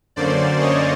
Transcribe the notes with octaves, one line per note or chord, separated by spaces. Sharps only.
F#2 D3 F#3 A#3 C#4 C5 D5
C#5 D#5